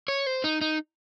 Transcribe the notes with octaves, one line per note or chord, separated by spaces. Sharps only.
C#5
C5
D#4
D#4